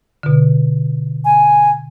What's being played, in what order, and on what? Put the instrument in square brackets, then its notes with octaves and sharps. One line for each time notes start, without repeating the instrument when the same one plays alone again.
[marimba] B2 D3
[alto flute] G#5